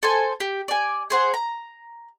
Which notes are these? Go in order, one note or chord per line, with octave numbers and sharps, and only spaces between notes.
A4 C5 G#5
G4
D5 G#5
G#4 C5 F#5
A#5